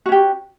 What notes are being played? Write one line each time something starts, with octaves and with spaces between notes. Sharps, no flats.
C#4 F#4 G4